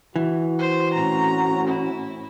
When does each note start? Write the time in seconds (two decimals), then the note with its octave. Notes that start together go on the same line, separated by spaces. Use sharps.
0.16 E3 F#4
0.59 C5
0.94 A2 C4 C#4 A#5
1.68 E4